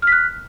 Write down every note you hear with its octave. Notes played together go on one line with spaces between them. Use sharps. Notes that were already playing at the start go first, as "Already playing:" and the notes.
F6 F#6 B6